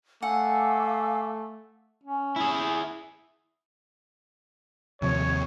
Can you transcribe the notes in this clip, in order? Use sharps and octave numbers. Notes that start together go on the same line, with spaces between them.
A3 F5 F#5 G#5 D6 E6
C#4
E4 G#4
D#2 C3 F3 C#5